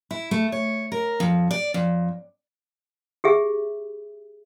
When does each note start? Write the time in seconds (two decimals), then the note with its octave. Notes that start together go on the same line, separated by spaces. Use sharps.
0.11 E4
0.31 A3
0.52 C#5
0.92 A#4
1.20 F2
1.51 D5
1.74 F2
3.24 G4 G#4 E5